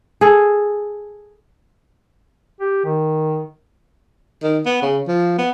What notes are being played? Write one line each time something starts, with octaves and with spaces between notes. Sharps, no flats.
G#4 A4
G4
D#3
D#3
B3
C#3
F3
B3